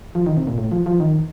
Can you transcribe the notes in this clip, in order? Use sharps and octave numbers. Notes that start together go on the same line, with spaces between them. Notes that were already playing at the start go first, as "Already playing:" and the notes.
F3
D#3
C3
A#2
A2
F3
F3
D#3